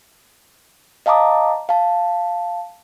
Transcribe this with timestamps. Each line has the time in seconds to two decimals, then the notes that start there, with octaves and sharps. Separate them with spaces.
1.06 D#5 F5 A5 A#5 D6 D#6
1.69 F5 A5